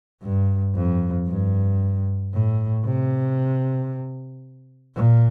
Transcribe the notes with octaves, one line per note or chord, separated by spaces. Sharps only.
G2
F2
G2
A2
C3
A#2